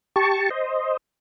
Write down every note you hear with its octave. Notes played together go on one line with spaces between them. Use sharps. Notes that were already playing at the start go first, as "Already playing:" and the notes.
G4 A5 C#6
C5 D#5